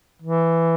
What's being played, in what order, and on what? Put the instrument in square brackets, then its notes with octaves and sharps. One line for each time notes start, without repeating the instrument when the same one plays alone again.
[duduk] E3